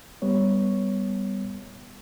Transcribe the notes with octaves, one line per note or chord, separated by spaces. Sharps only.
G3 B3 C#5